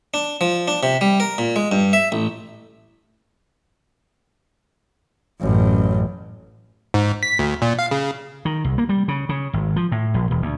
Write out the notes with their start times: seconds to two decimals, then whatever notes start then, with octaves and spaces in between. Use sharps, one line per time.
0.14 D4
0.41 F3
0.68 D4
0.83 C3
1.01 G3
1.20 A#4
1.38 A#2
1.56 G#3
1.72 G2
1.93 E5
2.12 A1
5.40 A1 F#2
6.94 G#2
7.23 B6
7.39 D2
7.62 A#2
7.79 F5
7.91 C#3
8.45 D#3
8.64 C2
8.78 A#3
8.89 G3
9.08 C#3
9.29 C#3
9.53 G#1
9.76 F3
9.92 A2
10.14 A#1
10.31 E1
10.42 D2